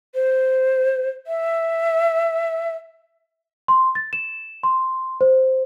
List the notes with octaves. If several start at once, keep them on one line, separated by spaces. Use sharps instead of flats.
C5
E5
C6
A6
E7
C6
C5